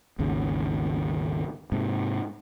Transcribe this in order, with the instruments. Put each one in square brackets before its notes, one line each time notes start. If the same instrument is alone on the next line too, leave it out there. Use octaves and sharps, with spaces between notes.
[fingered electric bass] G#1 D#2 C#3
G#2 C3